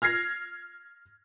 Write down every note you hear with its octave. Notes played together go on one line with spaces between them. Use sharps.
F6 G#6 A#6 C7